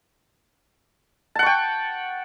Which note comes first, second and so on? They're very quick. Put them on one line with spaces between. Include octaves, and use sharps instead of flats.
A5 F#5 C#6 G5